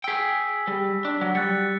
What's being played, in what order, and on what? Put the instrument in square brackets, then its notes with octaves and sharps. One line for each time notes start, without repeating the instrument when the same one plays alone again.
[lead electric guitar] G#4 G5 [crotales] E6 B6
[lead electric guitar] G3
D4
F#3
[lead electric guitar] G3 [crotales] F#6 A6 C#7